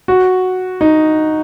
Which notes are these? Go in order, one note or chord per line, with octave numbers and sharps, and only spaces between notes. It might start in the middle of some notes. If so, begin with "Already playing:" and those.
F#4
D#4